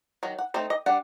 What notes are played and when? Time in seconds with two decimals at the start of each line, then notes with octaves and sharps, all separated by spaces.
0.23 D#3 F#3
0.39 F#5
0.54 A3 C4 D#4 C5
0.70 D#5
0.86 G3 D4 F#5